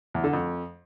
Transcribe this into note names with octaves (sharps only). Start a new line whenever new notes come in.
E2
D3
F2